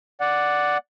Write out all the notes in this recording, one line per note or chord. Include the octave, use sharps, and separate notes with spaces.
D5 F#5